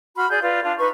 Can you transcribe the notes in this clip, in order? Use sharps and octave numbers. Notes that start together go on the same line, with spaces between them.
F#4 B5 C6 F6
G#4 D5 G6
F4 B4 D5
D4 F4
D#4 B4 C#6